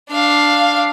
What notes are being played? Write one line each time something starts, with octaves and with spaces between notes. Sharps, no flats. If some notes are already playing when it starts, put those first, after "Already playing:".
D4 F5